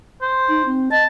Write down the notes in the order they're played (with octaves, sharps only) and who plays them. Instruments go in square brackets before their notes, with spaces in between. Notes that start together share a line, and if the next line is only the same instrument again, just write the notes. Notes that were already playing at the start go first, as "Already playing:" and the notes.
[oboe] C5
[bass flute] D#4
C4
[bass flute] D#5 [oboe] A5